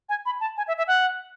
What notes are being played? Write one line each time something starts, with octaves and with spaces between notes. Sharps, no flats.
G#5
B5
A5
G#5
E5
E5
F#5